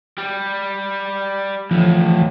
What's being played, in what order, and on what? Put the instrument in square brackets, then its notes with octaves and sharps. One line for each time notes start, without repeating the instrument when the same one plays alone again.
[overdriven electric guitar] G3
[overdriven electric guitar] D2 A2 [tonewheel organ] E3 F3